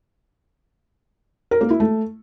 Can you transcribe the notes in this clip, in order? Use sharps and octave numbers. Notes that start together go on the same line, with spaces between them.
A#4
A#3
E4
A3